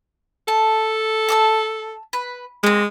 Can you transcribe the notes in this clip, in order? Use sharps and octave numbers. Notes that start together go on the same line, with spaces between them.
A4 A5
A5 D6 E6
B4
G#3 A#3 C4